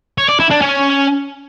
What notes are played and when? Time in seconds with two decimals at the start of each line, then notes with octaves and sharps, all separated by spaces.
0.18 C#5
0.29 D5
0.40 E4
0.51 D4
0.61 C#4